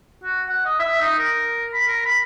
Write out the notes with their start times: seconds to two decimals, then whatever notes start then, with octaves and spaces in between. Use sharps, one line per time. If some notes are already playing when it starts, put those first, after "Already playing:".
0.24 F#4
0.49 F#5
0.65 D#5
0.79 E5
1.01 D#4
1.19 A#4
1.73 B5
1.88 A#4
2.06 B5